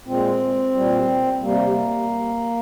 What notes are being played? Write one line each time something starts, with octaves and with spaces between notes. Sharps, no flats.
A#2 G#3 C4
A#2 G3
C3 G3 A#3